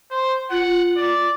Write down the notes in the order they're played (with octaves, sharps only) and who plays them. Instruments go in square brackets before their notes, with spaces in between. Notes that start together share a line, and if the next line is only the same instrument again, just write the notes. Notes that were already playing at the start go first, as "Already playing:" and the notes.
[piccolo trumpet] C5
[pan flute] F4 [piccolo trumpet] F#5
[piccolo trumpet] D5